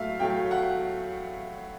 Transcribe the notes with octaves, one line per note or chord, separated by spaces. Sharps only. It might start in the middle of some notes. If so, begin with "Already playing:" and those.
Already playing: A2 F#3 A3 E5 F5
A2 F#3 A3 G5
F#5